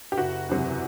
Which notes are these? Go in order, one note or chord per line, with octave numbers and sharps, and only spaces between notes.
G4
F#1 F#4
E2 C3 F#3